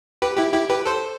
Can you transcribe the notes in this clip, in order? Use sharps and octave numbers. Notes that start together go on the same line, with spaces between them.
G4 B4
E4 G4
E4 G4
G4 B4
A4 C5